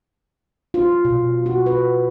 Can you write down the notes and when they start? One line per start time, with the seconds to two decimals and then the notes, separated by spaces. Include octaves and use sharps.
0.74 F4
1.05 B2
1.46 F#4
1.66 B4